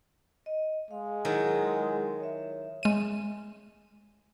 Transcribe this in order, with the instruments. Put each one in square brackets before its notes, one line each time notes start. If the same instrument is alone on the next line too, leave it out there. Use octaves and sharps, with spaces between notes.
[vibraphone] D#5
[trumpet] G#3 [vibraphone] F5
[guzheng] D#3 F#3 [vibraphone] E4 G#4 F#5
[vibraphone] C#5 E5
[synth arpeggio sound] G#3 D#7